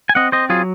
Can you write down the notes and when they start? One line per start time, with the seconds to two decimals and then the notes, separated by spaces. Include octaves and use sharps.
0.09 G#5
0.15 C4 D#5 F#5
0.32 C4 C5 D#5
0.49 F#3 F4 G#4